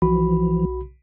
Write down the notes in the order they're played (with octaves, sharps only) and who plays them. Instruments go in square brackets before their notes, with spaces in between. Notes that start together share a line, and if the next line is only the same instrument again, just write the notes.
[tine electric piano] B1 F#4 B5 [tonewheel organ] E3 F3